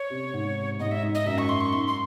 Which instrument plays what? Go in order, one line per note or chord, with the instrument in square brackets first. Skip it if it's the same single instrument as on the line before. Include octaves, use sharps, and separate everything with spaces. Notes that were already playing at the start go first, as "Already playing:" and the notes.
Already playing: [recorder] C#5
[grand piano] C3
G#2
[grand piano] G#2 [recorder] D#5
[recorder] E5
[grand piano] G#2
[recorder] D#5
[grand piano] F#2 [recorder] E5
[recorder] C#6
C6
C#6
[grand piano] G#2 [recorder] C6
[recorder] C6